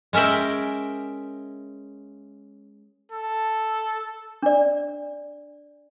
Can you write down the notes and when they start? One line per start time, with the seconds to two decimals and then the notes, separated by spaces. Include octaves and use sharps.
0.13 G#3 C#4 A#4 E5 G5
3.12 A4
4.42 D4 D5